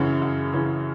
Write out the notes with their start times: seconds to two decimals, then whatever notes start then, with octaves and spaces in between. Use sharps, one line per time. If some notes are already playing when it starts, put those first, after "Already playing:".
Already playing: F#2 C#3 E3 C#4
0.22 F#2
0.53 C#3 E3 C#4